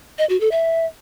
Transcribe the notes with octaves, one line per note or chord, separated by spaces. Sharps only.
D#5
F#4
A4
E5